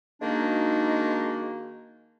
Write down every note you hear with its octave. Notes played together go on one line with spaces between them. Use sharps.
D#3 G#3 A#3 D4 D#4 F#4